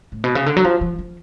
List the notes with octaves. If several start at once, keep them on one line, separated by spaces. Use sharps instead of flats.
A2
B2
C#3
D3
F#3
F3
F3
F3